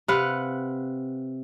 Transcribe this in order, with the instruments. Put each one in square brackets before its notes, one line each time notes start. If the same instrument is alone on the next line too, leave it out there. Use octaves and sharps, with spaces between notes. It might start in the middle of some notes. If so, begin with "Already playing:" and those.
[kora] C3 B4 F5 F#5